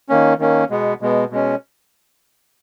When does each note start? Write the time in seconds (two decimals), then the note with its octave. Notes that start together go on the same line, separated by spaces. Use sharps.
0.09 D#3 A#3 C#4
0.39 D#3 A#3 C#4
0.70 B2 G#3 B3
1.01 B2 G#3 B3
1.30 B2 G#3 C#4